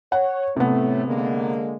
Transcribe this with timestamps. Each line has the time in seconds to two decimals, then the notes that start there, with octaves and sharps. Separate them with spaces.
0.12 C#5 F#5
0.56 A2 C3 F#3 A3 B3
1.06 D3 G#3 A#3